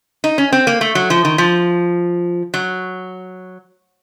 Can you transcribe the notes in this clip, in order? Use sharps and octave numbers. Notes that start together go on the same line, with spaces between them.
D#4
C#4
C4
A#3
A3
F#3
F3
D#3
F3
F#3